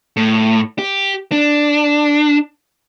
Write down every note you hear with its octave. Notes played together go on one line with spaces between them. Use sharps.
A2
G4
D4